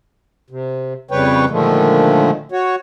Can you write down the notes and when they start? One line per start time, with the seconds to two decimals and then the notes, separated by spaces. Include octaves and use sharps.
0.50 C3
1.11 F2 C#3 G3 B4 C#5 G5
1.50 A#2 D3 D#3 F3 G#3 A3
2.52 F#4 C#5